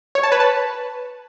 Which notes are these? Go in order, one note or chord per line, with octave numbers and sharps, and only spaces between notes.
C#5
A5
B4
A5